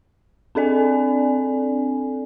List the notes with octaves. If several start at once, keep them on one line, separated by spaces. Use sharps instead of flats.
C4 D4 A4 D5 G#5